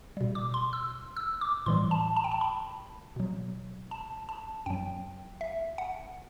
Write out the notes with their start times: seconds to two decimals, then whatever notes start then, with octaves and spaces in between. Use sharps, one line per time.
0.17 B2 G3
0.35 D6
0.54 C6
0.73 E6
1.17 E6
1.41 D6
1.66 A2 E3 G3 C6
1.91 A5
2.16 A5
2.24 G5
2.32 A5
2.41 B5
3.16 B2 F#3
3.91 A5
4.29 A5
4.66 F#2 F#3 G5
5.41 E5
5.78 F#5